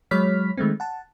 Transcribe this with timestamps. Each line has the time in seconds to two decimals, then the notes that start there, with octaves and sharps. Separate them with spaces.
0.11 F#3 G#3 C#5 B5 F6 B6
0.57 D#3 G#3 A3 C4
0.80 F#5 A5